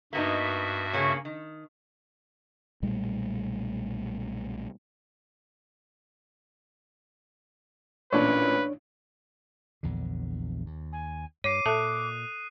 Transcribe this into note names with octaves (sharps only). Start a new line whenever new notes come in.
G2 A#3 B3 D#4 F#4 E5
C#3 A#3 C#4
D#3
B1 A#2 G3 A3
A1 A#2 C#4 D4 B4 C#5
A#1 E2 D3
D#2
G#5
G2 C#5 D6 C7 D#7
A#2 A4 E5 A5 D#6 F#6